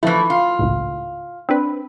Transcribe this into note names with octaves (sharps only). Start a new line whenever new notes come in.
E3 F3 A3 E4
F4
G#1 C#2 A2
C4 D4 B4